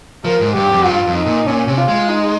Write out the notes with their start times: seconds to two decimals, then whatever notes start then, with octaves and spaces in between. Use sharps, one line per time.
0.25 F3 A#4
0.41 G#2
0.55 G2 G4
0.71 F2
0.86 G2 F4
1.07 F2
1.17 D#4
1.26 A#2
1.47 A#2 C#4
1.68 C3
1.78 F4
1.88 G#3
2.09 D#4